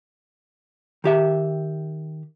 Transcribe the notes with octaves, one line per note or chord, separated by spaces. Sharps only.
D#3 G4 E5